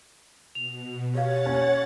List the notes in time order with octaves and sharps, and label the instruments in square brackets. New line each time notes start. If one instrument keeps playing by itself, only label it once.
[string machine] B2 [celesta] F7
[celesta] G4 F5 [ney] C#5 [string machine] F#5 A6
[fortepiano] C#4